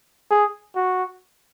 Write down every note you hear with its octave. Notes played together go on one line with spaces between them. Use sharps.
G#4
F#4